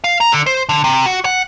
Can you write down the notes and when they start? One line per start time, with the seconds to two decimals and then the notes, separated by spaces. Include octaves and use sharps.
0.04 F5
0.21 A#5
0.32 D3
0.46 C5
0.69 D3
0.84 C3
1.06 F#4
1.25 F#5